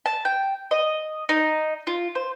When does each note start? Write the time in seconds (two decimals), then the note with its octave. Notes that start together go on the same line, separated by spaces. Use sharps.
0.06 A5
0.25 G5
0.71 D#5
1.29 D#4
1.87 F4
2.15 C5